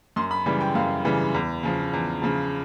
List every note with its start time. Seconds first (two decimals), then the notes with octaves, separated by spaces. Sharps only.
0.16 F#2 C6
0.31 B5
0.46 C#3 E3 G3
0.61 G5
0.75 F#2 F5
1.05 C#3 E3 G3
1.34 E2
1.63 C#3 F3
1.93 E2
2.22 C#3 F3